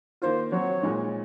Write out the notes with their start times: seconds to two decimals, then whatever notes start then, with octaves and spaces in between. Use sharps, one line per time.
0.22 D#3 A#3 F4 C5
0.52 F#3 C4 F#4 C#5
0.82 A#2 G#3 D#4